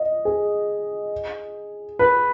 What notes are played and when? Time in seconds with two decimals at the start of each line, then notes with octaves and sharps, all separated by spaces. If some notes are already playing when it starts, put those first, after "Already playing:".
Already playing: D#5
0.25 G#4
1.99 B4